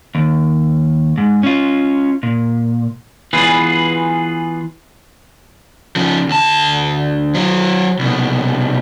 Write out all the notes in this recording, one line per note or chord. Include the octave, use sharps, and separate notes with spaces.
D#2
G#2
C#4 F4
A#2
E3 B3 F4 G#4 B4
C#3 F3
D2 A5
F#3 C5
C2 B2